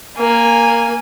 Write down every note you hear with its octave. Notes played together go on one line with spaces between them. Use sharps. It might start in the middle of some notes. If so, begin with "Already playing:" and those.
A#3 G#5